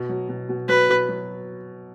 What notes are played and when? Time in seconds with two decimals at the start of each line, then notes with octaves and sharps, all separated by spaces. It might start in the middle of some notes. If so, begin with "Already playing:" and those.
Already playing: B2
0.09 F#3
0.29 B2
0.49 B2
0.68 F#3 B4
0.89 B2
1.09 F#3